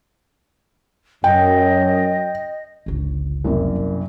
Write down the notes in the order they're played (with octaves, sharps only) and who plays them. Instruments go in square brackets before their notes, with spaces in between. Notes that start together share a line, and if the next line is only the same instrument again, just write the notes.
[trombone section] F#2 [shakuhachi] D#5 [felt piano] G5
[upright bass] G1 C#2
[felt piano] C2 F#2 A#3
[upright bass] B1